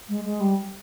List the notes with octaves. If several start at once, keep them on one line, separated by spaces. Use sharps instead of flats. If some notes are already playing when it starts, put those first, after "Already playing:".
G#3
G#3
G3